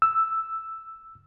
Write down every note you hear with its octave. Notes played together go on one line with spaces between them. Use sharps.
E6